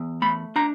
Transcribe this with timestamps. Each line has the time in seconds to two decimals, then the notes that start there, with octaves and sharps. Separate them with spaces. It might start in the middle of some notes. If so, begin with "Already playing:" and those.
Already playing: E2
0.22 A3 B5
0.56 D4 A#5